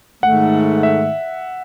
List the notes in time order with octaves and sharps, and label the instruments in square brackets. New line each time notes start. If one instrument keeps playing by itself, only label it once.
[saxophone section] G#2 D#3 A3 [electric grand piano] F#5
[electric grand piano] E5